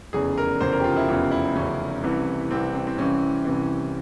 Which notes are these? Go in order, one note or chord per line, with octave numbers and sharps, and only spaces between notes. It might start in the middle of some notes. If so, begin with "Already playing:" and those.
F1 E2 C#3 G#4
A#4
F1 E2 C#3 C5
A#4
G4
F4
E4
F1 E2 C#3 F4
E4
F1 E2 C#3 C#4
C2 C3 E3
C2 C3 E3 C4
C4
C4
C2 C3 E3 C#4
C2 C3 E3